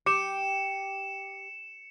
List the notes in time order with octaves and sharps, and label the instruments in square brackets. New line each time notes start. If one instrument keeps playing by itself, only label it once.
[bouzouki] G4 [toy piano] D6 [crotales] C#7 E7